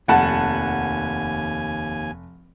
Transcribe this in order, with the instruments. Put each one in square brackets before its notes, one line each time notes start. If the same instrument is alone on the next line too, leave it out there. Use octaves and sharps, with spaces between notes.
[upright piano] F1 F#5 A5 [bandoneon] D#2 G#5